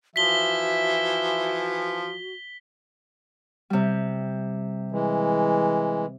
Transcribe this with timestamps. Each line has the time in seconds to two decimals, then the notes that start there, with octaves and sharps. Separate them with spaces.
0.16 E3 F3 F#4 E5 B6 G7
3.70 C3 G3
4.92 E3 G#3